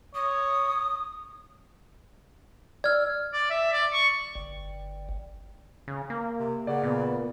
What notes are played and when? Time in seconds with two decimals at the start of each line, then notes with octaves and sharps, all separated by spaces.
0.15 C#5 D#6
2.84 D5 E6 F6 G#6
3.33 D5
3.50 E5
3.72 D5
3.94 C#6
4.35 G1
5.88 C#3
6.10 A#3
6.39 C3
6.67 C#3 D5 F#5
6.83 A#2 B3